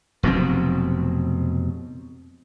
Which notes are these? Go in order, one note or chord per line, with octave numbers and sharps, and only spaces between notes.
F1 B2 F#3 C4